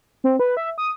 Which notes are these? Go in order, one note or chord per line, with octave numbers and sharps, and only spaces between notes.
C4
B4
E5
D#6